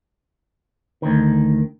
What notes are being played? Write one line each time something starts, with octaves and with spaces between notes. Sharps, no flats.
D2 D#3